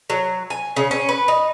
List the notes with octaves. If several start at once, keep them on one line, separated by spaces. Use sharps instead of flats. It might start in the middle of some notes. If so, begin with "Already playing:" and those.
F#3
G#5
C#3
C#4
B4
D#4